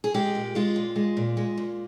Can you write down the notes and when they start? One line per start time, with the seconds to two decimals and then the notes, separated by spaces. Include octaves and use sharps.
0.04 G#4
0.14 G#3 G4
0.35 A#2
0.55 G#3 F4
0.76 A#2
0.96 G#3
1.17 A#2
1.37 G#3
1.58 A#2